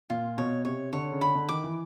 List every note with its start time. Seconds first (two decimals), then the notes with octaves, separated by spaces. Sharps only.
0.10 A#2 F4
0.38 B2 C#5
0.65 C3 C#5
0.93 D3 C#5
1.12 C#3
1.21 D3 B5
1.35 D3
1.49 D#3 D6
1.64 E3